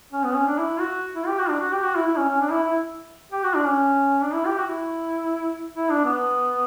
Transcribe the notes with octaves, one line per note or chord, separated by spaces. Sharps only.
C#4
B3
C#4
D4
E4
F#4
E4
G4
F#4
D4
F#4
G4
F#4
E4
E4
C#4
C#4
D4
E4
E4
G4
F#4
D4
C#4
D4
E4
G4
F#4
E4
E4
D4
B3